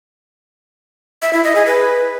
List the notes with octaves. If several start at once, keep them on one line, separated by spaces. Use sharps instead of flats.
E5
E4
D#5
G#4
B4